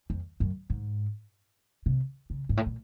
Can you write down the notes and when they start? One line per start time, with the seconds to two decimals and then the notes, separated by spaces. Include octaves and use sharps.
0.10 F2
0.40 F#2
0.70 G#2
1.86 C3
2.30 C#3
2.49 G#2
2.57 A2
2.66 A#2